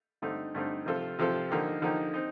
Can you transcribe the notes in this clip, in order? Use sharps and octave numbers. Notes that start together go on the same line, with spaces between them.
G2 D3 A3 C4 D#4
G2 D3 A3 C4 D#4
C3 F3 C4 F4 A4
C3 F3 C4 F4 A4
D3 F3 A#3 D#4 G4
D3 F3 A#3 D#4 G4
C4 D#4